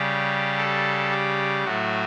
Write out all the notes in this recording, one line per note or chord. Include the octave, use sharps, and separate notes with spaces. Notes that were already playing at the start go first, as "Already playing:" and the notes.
Already playing: C#3 G3 G4
A4
G4
A2 F#3 A3 F#4